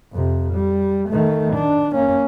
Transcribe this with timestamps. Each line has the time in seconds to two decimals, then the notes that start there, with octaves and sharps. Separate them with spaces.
0.12 F2 C3
0.53 G3
1.10 D#3 A3
1.54 D4
1.94 A#3 C#4